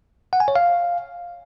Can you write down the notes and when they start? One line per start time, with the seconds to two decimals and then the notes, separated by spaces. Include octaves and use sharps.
0.33 F#5
0.40 G#5
0.48 C#5
0.56 F5